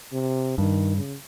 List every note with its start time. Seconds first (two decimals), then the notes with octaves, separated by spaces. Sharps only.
0.13 C3
0.58 G2 D#3
0.96 C#3